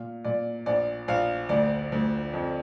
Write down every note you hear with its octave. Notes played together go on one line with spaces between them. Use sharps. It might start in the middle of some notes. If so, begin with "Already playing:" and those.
Already playing: A#2 F5
A#2 D5
A#1 D5
A#1 F5
D2 D5
D2
F2